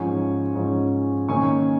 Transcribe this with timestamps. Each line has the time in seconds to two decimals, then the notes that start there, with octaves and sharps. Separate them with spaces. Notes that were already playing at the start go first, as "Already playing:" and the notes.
Already playing: G#2 F3 C#4 G#5 C#6
0.55 G#2 F3 C#4
1.29 D#3 A#3 C#4 G#5 C#6